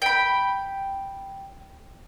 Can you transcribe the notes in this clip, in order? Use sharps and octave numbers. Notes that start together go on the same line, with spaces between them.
G5 B5